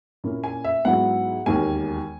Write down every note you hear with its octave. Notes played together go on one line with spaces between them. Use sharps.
A#2 A#3 C#4 E4
G#5
E5
G#2 F#3 B3 E4 F#5
E1 D#2 D#3 A#3 G#5